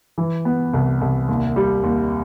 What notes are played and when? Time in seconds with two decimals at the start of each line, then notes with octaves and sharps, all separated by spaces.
0.18 E3
0.45 B3
0.73 C2
1.01 C2
1.28 D#2
1.56 G3
1.84 D#2